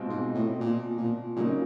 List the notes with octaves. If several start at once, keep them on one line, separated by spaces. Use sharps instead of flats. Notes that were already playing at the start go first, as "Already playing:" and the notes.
Already playing: B2 G#3 C4 F4
G#2
A2
A#2
A#2
A#2 C#3 F#3 A#3 D#4